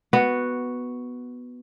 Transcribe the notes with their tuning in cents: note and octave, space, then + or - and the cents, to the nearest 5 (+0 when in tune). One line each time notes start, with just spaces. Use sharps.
B3 +0 F#4 +0